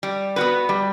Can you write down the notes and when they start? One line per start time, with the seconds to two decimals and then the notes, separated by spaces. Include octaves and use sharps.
0.03 G3
0.36 B3 F#4 B4
0.69 G3